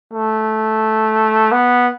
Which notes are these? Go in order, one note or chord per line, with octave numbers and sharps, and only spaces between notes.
A3
B3